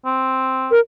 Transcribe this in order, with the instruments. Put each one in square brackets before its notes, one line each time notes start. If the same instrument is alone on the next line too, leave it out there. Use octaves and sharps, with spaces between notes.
[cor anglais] C4
[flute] A#4